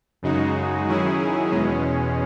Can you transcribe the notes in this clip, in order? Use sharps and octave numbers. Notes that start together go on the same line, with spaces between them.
F#2 C#3 G#3 D#4 F#4
D#3 F#3 C#4 E4 G#4
E2 B2 G#3 C#4